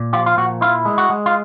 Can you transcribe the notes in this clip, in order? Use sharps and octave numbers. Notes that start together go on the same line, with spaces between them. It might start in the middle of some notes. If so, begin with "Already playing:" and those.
Already playing: A#2
F3 F4 G4
F4
A#2 F#4
E4 F4
G#3
F#4
G#3
F4